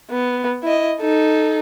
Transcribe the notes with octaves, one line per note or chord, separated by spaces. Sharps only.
B3
E4 D#5
D#4 A4